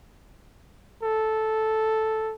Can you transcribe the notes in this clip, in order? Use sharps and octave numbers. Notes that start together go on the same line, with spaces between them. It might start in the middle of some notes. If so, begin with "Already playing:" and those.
A4